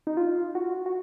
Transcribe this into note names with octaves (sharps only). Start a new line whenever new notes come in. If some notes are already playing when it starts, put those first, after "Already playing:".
D#4
F4
F#4
F#4